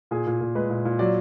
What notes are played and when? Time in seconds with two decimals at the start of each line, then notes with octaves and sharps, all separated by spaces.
0.11 A#2 G#4
0.27 A#2
0.41 A#2
0.55 G#3 B4
0.70 A#2
0.85 A#2
0.99 F#3 D5